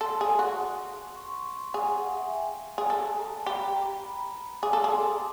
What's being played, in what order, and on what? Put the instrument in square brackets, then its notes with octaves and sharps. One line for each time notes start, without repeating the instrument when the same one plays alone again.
[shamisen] A4 [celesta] C6
[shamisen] G#4
F#4
[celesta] C#6
C6
C#6
C6
[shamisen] G#4 [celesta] F#5
[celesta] F#5
F5
E5
G#5
G5
G5
[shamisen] G#4
[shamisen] A4 [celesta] G#5
[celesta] A5
A#5
[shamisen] G4 [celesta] B5
[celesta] A#5
B5
[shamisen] G#4 [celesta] D6
[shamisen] A4
G#4
[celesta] C6
A#5